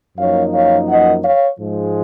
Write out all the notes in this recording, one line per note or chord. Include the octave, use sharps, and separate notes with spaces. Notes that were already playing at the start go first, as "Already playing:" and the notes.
F#2 F3 A#3 D#4 C#5 F5
C#5 F5
D#5 F#5
C#5 F5
G#2 F3 G#3